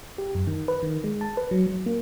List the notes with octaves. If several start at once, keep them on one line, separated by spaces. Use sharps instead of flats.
G4
F#2
D#3
B4
D#3
G#3
A5
B4
F#3
F#3
A#3